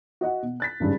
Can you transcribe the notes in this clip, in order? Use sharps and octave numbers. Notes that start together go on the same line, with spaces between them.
F#4 D#5 F#5
B2
F#6 A6 B6
G#1 G2 C#3